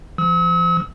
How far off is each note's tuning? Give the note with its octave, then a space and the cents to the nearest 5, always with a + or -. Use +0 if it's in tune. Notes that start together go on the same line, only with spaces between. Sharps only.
F3 -30 E6 -45